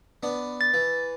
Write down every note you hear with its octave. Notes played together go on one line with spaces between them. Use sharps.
B3 D4
A6
E3